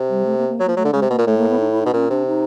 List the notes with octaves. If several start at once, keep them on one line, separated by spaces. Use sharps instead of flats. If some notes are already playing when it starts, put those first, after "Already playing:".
Already playing: C3
G3
A3
A#3
A#3
F#3
F3 A#3
F#3 A3
D3
C#3 G#3
C3
B2 A#3
A#2
A2 A3
A#3
B3
D#4
E4
B2 D#4
A#2 C#4
C3 D4
D#4